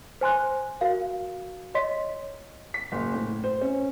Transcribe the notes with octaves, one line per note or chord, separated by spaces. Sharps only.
C5 G#5 C6 F#6
F#4 A#4 F5
C#5 D#5 C6 B6
B6
F#1
A2
C5
C#4